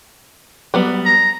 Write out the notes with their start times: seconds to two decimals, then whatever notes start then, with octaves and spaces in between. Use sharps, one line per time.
0.74 F#3 G3 B3
1.05 A#5